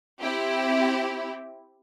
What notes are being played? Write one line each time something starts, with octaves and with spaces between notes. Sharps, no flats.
C4 E4 G4